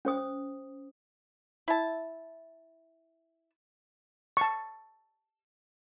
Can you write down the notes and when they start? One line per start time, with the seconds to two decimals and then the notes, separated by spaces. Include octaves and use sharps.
0.05 C#4 C5 D#6
1.68 E4 A5
4.37 A5 C#6